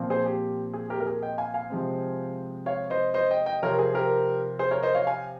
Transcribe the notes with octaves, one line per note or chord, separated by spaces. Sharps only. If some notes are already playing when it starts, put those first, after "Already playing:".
Already playing: A#2 F3 C4
G#4 C5
G4
G#4
G4 A#4
A#4
G#4
D#5 G5
F5 G#5
F5 G#5
C3 F3 G#3 C4
C#5 F5
C5 D#5
C5 D#5
D#5 G5
D#5 G5
C3 F3 C4 A#4 C#5
G#4
G4 A#4
G#4 C5
A#4 C#5
C5 D#5
C#5 F5
F5 G#5